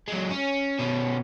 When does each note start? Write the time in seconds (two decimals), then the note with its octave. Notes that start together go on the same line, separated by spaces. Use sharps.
0.08 F#3 G#3
0.31 C#4
0.80 B2 C#4